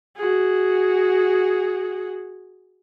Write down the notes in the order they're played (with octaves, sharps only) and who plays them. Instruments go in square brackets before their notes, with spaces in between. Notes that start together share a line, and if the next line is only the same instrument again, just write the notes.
[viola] F#4 G#4